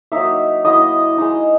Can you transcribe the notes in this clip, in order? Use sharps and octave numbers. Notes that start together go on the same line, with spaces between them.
F#3 A#3 D#4 E5
F#3 A#3 E4 D#5
G#3 D#4